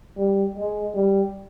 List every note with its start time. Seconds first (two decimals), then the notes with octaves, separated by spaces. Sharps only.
0.17 G3
0.55 G#3
0.94 G3